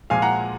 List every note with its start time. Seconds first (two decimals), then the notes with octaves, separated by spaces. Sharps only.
0.10 A#2 F3 G#3 F5 G#5
0.22 F#5 A#5